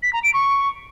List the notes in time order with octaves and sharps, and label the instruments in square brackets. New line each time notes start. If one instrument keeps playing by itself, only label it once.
[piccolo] B6
A#5
D7
C#6